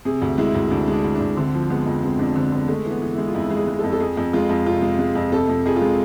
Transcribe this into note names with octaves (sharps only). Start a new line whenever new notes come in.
C3 G#4
D2
G#3 E4
D2
D2 D4
G#3
D4
D2
D2 D4
D3 C4
F3
G#3 B3
F2
G#3 C4
F2 D4
D3 C4
D3 B3
G#3 A3
E3
B3
E3
G#3 E4
F4
F2 E4
G#3
G#4
G#3
A4
F2
A4
F2 G#4
F2
G#3 F4
F2
C3 F4
G#3
G#3
F2
C3 A4
F2
F2 G#4
F4
G#3